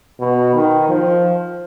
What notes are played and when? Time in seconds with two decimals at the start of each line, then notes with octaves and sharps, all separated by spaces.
0.20 B2
0.54 D#3
0.88 F3